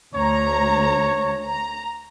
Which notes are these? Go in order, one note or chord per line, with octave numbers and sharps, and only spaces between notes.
D2 C#5 A#5
A#5